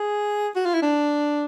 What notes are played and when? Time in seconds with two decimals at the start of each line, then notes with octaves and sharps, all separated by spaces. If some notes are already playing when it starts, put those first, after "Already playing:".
Already playing: G#4
0.56 F#4
0.65 F4
0.74 E4
0.83 D4